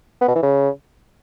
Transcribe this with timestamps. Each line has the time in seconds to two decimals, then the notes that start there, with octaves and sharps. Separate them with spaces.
0.21 B3
0.28 B2
0.35 E3
0.43 C#3